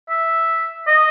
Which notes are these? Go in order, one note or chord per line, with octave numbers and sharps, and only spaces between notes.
E5
D#5